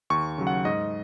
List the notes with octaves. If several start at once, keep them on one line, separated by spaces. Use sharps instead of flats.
D#2 C#6
C#3 F#3
F#5
G#2 D#5